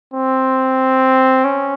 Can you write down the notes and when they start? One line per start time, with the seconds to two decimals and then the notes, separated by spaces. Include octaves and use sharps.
0.14 C4
1.45 C#4